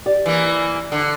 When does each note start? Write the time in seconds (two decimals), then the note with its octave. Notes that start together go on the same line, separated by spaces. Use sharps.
0.06 G4 D5
0.26 E3 A#3
0.92 D3